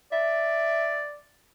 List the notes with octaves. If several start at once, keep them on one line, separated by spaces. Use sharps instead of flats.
D5 E5